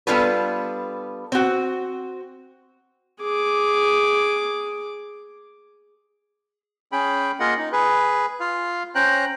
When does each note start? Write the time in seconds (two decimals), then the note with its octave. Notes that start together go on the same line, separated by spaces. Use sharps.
0.07 G3 B3 D4 F4 A4 B4
1.32 C4 F#4
3.21 G#4 D6
6.92 C#4 G#4 G5 B5
7.40 A#3 F4 G#4 A#4 D#5 F#5
7.57 D#4
7.72 G#4 B4
8.40 F4 F5
8.95 C#4 C5 G5 A#5 F#6